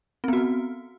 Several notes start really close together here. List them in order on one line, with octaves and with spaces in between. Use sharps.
C4 B3 F#4